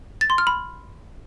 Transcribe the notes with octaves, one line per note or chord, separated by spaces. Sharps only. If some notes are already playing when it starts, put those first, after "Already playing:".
A6
C6
F6
B5